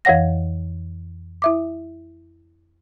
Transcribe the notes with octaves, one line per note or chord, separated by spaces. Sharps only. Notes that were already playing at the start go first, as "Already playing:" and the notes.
F2 E3 C#5 F#5 A#6
E4 E5 D6